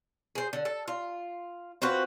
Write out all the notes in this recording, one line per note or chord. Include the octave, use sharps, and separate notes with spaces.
G#4 C5
D3
A4
F4
C4 F4 F#4 B4